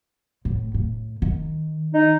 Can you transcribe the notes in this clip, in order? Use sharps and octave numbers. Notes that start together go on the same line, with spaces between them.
A2
A2
D#3
D#4